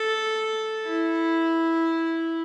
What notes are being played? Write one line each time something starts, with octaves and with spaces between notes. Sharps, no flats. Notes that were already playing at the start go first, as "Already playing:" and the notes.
Already playing: A4
E4